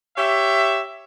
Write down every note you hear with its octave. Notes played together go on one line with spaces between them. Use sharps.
G4 C#5 E5